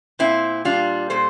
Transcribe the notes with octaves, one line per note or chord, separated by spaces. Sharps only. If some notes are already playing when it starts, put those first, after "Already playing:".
A#2 C4 E4
G3 D4 F4
A#2 A4 C5